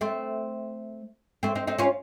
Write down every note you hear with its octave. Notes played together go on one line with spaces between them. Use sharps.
A3 C4
A3 C4
C4 D#4
C4 D#4
C#4 F4